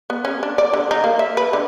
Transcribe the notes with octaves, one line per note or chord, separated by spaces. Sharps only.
B3
C#4
D4
D5
D3
D#4
A#3
E5
B4
D3